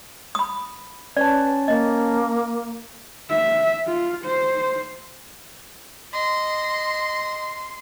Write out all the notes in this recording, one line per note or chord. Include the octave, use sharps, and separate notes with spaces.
B5 D#6
C#4 B4 C#5 D5 A5
A#3 D#5
E5
F4
C5
D#5 C6